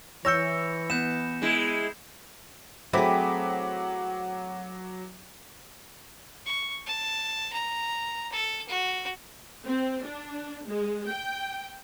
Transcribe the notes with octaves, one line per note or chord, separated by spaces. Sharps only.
E3 C#5 E6 G6 A#6 C#7
B3 G6 E7
G#3 E4
F#3 A3 C4 E4 G#4 F#5 D6 B6
C#6
A5
A#5
A4
F#4
C4
D4
G#3
G5